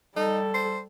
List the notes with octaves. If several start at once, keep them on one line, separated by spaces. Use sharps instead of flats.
G3 D#4 A4
C5